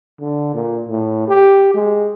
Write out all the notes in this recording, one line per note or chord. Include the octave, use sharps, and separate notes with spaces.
D3
A#2
A2
G4
G#3